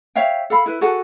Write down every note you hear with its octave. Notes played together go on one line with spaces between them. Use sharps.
C#5 E5 F5 G5
A4 F5 B5
E4 B4
F#4 G#4 A4 F#5